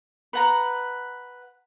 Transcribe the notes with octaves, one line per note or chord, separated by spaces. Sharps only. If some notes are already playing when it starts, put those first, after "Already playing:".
B4 F#5 A#5